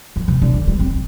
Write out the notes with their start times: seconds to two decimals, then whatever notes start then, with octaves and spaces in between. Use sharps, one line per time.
0.16 F3
0.28 C3
0.42 D3
0.54 G3
0.67 G3
0.79 C4